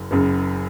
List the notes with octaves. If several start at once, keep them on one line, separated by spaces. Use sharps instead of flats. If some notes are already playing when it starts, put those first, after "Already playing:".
Already playing: F#1 F#2
F#1 F#2 C#3